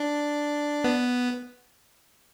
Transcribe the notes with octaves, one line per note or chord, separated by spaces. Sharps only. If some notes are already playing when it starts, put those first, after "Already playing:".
Already playing: D4
B3